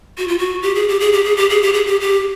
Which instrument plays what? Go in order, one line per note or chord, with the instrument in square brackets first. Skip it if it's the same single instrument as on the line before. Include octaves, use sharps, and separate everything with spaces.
[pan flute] F#4
F4
F#4
G4
G#4
G4
G#4
G4
G#4
G4
G#4
G4
G#4
G4
G4